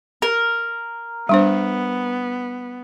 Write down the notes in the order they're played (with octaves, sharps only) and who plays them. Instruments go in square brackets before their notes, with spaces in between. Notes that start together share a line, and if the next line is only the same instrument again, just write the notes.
[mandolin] A#4
[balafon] G3 D4 C5 [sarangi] B3